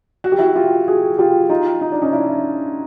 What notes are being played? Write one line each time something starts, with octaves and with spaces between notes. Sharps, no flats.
F#4
G4
E4 F#4
F4 G4
F#4 G#4
F4 G4
D#4 F4
D#4
D4
C#4 D#4
D4 E4